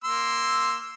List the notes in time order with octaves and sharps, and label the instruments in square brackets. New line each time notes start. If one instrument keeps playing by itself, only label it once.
[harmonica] A#3 C6 E6